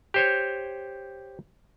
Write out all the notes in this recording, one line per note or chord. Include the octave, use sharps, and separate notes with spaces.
G4 C5 C#5